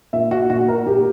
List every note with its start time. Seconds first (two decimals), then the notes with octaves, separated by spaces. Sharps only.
0.13 A#2 E5
0.31 F#4
0.50 A#2 F#4
0.68 A#4
0.86 A#2 G4